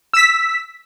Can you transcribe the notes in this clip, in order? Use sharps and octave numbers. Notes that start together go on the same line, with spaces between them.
E6 B6